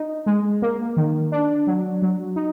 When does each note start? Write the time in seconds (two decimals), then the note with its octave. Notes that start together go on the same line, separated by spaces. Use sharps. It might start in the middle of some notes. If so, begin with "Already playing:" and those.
Already playing: D#4
0.26 G#3
0.62 A#3
0.97 D#3
1.32 D4
1.67 F#3
2.02 F#3
2.36 D#4